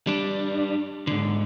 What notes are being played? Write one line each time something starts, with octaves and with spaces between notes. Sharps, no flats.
G3 D4
G#2 D3